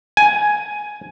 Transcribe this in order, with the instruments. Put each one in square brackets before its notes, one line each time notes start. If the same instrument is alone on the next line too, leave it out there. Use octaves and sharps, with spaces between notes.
[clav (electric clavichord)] G#5